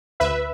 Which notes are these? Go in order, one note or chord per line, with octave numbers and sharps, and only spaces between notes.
D2 B4 E5